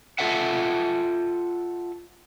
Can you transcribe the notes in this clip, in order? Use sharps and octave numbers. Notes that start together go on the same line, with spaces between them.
F4 F#4 A4 E5 F#5